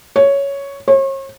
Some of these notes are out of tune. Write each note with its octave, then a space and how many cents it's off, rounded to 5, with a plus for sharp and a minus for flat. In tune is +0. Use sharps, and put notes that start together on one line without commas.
C#5 +5
C#5 -40